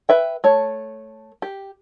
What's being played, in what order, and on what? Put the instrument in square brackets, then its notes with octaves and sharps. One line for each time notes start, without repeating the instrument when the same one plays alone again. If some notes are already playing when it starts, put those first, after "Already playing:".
[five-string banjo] B4 E5 G5
A3 C#5
G4